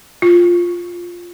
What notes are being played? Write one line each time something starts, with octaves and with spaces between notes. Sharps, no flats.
F4